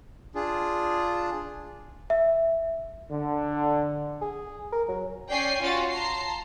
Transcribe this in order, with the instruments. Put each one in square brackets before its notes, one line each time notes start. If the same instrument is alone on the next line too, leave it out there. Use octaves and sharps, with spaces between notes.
[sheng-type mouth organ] D4 F4 G#4
[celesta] E5
[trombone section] D3
[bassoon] G#4
A#4
F#3
[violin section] C#4 D5 G5 G#5 C7
C#4 F4 F#4 A6
A5 A#5 C6 C7